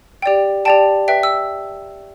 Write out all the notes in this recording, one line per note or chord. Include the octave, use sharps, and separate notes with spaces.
G4 D5 G5
G4 D5 G5 A5
B4 E5 G5
E6